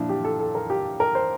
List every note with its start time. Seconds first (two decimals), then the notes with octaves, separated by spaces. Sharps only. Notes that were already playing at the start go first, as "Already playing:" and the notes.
Already playing: A#2 F3 D4 E4
0.09 G4
0.24 A4
0.40 A4
0.55 A#4
0.70 G4
1.00 A#4
1.15 C5